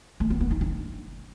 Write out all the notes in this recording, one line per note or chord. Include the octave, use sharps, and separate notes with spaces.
A3
B3
B3
D#4
D4